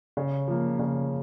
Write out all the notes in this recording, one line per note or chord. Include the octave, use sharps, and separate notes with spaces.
C#3
F3 A#3
C#3